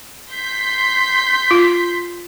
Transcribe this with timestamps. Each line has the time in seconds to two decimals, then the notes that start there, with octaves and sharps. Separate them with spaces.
0.32 C6 G6 B6
1.51 F4